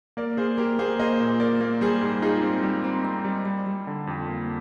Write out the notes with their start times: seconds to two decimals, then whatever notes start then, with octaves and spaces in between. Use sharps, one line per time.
0.17 A#3 A#4 D5
0.37 A#3 G#4 C5
0.58 A#3 G4 A#4
0.79 A#3 G#4 C5
0.99 A#3 C5 D#5
1.20 A#2
1.40 A#3 A#4 D5
1.61 A#3
1.81 G3 G#4 C5
2.01 G#2
2.22 D#4 F4 G#4
2.43 C4
2.63 G3 G4
2.84 C4
3.05 C4
3.25 G3
3.46 G3
3.67 G3
3.87 D3
4.07 F2
4.28 A#3